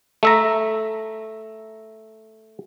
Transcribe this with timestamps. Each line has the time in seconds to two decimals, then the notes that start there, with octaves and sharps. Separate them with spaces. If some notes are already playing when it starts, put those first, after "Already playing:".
0.23 A3 E5 A#5